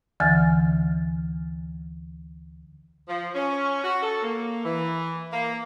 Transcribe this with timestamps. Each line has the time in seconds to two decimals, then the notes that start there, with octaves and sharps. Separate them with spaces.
0.20 D2 D3 E3 G#5 F6 A6
3.08 F3
3.35 C#4
3.84 F#4
4.02 A4
4.23 A#3
4.64 E3
5.33 A#3